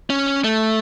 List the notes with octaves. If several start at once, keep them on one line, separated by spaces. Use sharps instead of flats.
C#4
A3